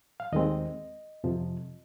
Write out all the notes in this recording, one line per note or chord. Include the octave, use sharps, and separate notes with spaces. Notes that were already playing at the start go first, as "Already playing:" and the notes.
F5
D#2 D#3 G#3 C4 D#5
F2 C3 F3